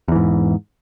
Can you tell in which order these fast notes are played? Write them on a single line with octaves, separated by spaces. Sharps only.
E2 E3 G#2